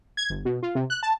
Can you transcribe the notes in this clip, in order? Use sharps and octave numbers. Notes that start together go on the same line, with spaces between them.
G#6
G1
B2
F4
C3
F#6
A5